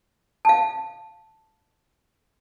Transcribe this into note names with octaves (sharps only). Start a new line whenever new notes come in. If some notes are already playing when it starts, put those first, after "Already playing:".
F5 A5